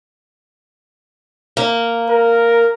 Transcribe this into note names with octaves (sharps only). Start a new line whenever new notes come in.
A#3
A#4